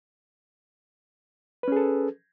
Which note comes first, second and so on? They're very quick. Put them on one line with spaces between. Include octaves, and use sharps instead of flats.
B4 C#4 G#4 A4